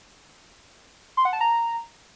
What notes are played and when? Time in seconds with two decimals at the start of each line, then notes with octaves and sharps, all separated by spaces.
1.17 C6
1.25 F#5
1.33 A5
1.41 A#5